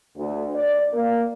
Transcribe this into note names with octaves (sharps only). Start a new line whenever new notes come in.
D2
D5
A#3